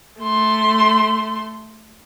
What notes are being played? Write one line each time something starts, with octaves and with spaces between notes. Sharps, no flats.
A3 C6